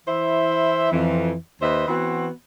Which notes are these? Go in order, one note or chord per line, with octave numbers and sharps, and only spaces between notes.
E3 E4 C5 E5
F2 E3
D#2 B4 C5 D#5 E5
E3 B3 C4 F#4